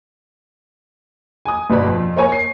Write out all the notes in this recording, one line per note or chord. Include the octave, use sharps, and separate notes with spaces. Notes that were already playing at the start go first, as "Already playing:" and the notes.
G#5 D#6
G1 B2 B3 D5 B5
F2
A#3 C#5 G#5 C#6
C7